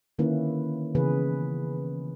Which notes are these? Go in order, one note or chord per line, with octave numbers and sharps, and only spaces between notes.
D3 D#3 A#3 C#4 E4 B4
C#3 E3 B3 G#4 B4